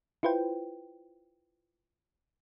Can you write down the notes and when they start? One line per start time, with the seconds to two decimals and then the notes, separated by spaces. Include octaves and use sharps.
0.23 E4 F4 B4 C5 G5